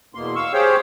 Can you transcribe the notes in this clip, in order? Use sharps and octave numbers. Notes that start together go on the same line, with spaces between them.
E2 B2 A#3 C6
F5 C#6 E6
G4 G#4 C5 C#5 F5 G5